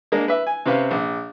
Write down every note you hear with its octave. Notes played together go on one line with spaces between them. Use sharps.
G#3 A#3 D4
B4 E5
G#5
C3 C4 C#4 B4 F5
A#1